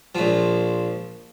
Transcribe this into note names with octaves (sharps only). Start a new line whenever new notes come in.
A#1 F3